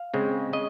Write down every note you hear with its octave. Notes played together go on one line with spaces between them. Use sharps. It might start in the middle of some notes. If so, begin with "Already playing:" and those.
Already playing: F5
C#3 G#3 C4
C#3 D#5